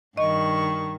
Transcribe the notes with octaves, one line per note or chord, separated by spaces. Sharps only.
G2 D#3 D#5 C#6